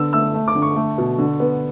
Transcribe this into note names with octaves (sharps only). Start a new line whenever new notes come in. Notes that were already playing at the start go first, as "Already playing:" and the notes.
Already playing: D3 B3 E6
A3 E6
A3
D6
D3
C#6
A3
B2
D3
B3